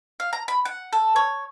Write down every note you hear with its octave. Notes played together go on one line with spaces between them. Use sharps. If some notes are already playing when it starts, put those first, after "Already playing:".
F5
A#5
B5
F#5
A4
C#5